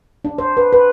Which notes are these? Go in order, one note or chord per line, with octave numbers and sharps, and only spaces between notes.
D4
C5
B4
B4